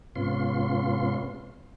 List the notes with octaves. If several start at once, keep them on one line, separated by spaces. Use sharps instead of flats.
G#2 C3 B3 C#4 F4 C6